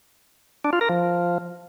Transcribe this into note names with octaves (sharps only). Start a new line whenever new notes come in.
D4
F4
A#4
F3